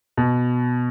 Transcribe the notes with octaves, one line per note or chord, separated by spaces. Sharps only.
B2